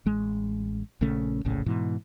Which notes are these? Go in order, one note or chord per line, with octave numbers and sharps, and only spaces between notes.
A1 G#3
A#1 C#3 A3 C#4
F1 A#1 A2 C#3
G#2 B2 E3